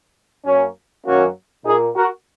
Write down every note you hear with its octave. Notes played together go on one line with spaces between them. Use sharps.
F#2 F#3 A#3 C#4
F#2 D#3 F#3 A#3 C#4 F#4
A#2 A#3 D#4 G#4
F#4 A#4